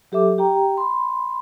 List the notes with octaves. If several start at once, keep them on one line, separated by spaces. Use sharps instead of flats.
F#3 G4 A4 E5 D6
G4 G5 A#5
B5 C6